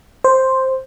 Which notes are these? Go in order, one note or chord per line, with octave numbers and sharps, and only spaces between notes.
C5